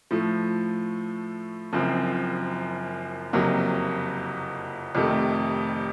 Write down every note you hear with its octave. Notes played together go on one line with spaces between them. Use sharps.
A2 F3 A3
F#1 F#2 F3 C4
F#1 F2 C3 F#3 A#3
F1 F2 C3 D#3 A3